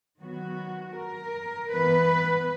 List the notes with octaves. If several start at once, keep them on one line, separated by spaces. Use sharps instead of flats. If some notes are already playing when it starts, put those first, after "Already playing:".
D#3 F#3 B3 F#4
A#4
E3 B3 B4